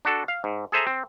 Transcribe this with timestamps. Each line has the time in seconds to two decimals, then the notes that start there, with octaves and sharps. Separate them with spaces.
0.05 D4 F#4 A4
0.28 F5
0.44 G#2
0.72 G#4 A4 C5 E5 G#5 A#5
0.87 C4